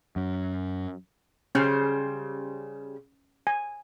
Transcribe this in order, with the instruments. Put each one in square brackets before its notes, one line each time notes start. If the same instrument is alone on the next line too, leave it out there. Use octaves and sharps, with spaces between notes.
[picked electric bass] F#2
[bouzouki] C#3 G3 C5 [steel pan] C#4
[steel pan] G#5